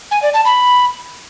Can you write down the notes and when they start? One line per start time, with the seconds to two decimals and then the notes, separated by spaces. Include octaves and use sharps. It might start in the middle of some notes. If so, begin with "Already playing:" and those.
0.11 G#5
0.23 D5
0.34 A5
0.45 B5